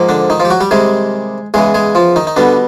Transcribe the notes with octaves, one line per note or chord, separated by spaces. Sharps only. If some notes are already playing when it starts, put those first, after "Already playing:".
Already playing: G#2 F3 A#3
D3 D4
D#3 D#4
F3 F4
G4
F#3 F#4
G3 G4
C3 D#3 G3 G#3 G#4
E2 C#3 E3 G#3 G#4
G#3 G#4
F3 F4
D#3 D#4
D#4
B2 D3 G3 B3 D4